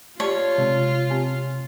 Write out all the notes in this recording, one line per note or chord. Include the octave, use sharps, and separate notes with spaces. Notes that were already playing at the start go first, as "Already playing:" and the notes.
F4 G4 C#5 D5 A5
C3 G#3 C4
C4 G4 G#5